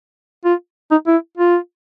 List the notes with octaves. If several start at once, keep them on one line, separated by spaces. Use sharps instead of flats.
F4
D#4
E4
F4